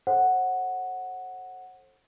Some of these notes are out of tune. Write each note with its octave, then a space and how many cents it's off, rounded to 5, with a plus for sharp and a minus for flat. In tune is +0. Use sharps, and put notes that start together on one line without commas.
A4 -5 C5 +40 F#5 +0